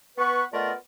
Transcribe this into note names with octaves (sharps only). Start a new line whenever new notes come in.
B3 B4 C#6
A3 B3 F4 A#4 D5 D#5